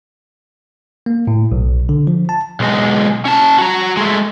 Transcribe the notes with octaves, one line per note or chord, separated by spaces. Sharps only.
A#3
A2
B1
D3
F3
A5
B1 G#3
C#4 A5
F#4 A#5
G#3 A3